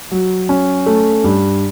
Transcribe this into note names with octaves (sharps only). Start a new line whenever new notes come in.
F#3
C#4
A3
G2